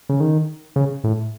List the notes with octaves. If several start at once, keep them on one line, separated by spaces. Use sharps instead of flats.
C#3
D#3
C#3
A2